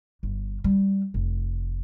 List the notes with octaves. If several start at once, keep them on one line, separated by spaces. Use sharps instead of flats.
G1
G3
F1